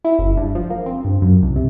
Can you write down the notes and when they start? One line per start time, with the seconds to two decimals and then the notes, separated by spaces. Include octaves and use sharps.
0.05 E4
0.19 F#1
0.37 G2
0.55 F3
0.70 A#3
0.86 C4
1.04 G2
1.22 F#2
1.43 C2
1.56 C3